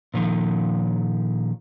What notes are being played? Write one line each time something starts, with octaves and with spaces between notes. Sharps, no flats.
A#2 D#3 F3